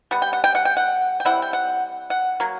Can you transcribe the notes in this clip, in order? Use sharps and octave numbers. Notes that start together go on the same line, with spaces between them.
G3 B3 F#5
G5
F#5
G5
F#5
G5
F#5
G5
E3 G3 C4 E4 F#5
G5
F#5
F#5
F#3 A#3